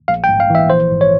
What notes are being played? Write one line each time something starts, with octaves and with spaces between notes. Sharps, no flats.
A#1 F5
G5
G#2
F5
E3 E5
A#1 C5
G#2
C#5